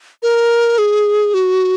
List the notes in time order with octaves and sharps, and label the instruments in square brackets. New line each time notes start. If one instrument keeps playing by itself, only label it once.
[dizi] A#4
G#4
F#4